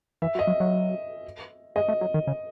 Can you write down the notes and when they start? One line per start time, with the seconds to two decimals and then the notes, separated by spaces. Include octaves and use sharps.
0.22 E3 E5
0.35 F#3
0.39 D#5
0.47 F#3
0.60 F#3
1.76 G#3 D#5
1.88 A3
2.01 F#3
2.14 D#3
2.27 C#3